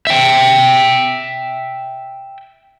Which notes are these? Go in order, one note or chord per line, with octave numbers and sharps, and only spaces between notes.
E5 G5